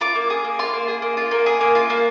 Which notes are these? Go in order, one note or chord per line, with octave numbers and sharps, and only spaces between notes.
F4 D6
A#3
G#4
A#3
F4 C6
A#3
G#4
A#3
F4
A#3
G#4
A#3
F4
A#3